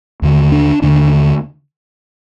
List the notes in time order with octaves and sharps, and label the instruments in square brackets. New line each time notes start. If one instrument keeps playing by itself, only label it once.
[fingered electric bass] D#2 D3
D4
D#2 D3 D4